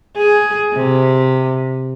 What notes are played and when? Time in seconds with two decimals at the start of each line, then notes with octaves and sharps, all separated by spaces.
0.16 G#4
0.74 C3